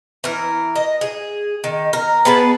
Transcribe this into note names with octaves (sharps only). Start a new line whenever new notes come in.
E3 A#4
D#5
G#4
D#3
A#4
B3 G#4 B4 A5